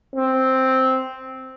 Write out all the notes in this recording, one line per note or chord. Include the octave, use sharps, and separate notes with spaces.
C4